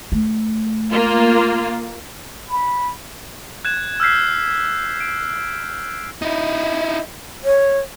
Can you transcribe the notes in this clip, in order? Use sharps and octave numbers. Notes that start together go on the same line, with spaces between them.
A3
A#3 F4
B5
F#6 G#6 E7
E6 F6 G6 B6 C7
D7
D#4 E4
C#5